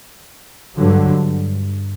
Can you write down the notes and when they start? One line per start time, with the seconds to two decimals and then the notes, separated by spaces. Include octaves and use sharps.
0.76 G2 D3 F#3